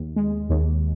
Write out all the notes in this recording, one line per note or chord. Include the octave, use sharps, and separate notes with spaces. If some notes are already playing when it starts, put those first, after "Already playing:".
Already playing: D#2
G#3
D#2